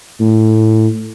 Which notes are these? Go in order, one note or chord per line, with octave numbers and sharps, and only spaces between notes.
A2